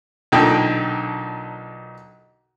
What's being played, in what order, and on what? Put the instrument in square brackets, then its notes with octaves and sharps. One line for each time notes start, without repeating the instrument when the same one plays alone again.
[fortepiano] B1 A#2 D3 D#4 G5